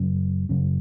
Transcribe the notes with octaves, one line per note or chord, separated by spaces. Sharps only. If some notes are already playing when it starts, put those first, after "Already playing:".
Already playing: F#2 C#3 F#3 C#4
F#2 C#3 F#3 C#4